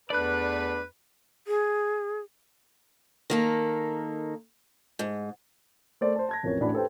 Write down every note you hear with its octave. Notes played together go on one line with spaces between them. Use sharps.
E2 A3 D4 B4 D5 F#6
G#4
D#3 A#3 A4
G#2
A3 A#4 C5 D5
C5 A5
A5 G#6 A#6
A1 F2 A#4 C#5
A1 A2 D4 F#4 B5
G4 A4 B4 C5 G5